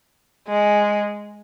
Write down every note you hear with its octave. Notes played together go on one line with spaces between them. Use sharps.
G#3